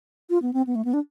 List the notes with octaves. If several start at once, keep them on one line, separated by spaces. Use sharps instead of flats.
F4
B3
C4
B3
A3
B3
D4